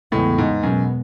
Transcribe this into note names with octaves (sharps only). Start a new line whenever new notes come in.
E2 A2 C#3 E3 G#3 B3
G#2
F#2 B2 G#3 B3